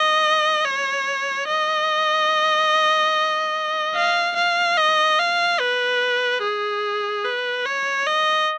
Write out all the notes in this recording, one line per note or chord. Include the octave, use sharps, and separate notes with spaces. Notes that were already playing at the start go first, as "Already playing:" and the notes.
Already playing: D#5
C#5
D#5
F5
F5
D#5
F5
B4
G#4
B4
C#5
D#5